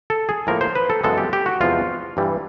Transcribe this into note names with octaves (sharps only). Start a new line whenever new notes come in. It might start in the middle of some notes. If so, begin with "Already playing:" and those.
A4
G#4
A2 F3 A#3 A#4
C5
B4
A4
F#2 C#3 E3 G#3 B3 A4
G4
G4
F#4
E2 C3 F3 G#3 F4
G2 E3 G3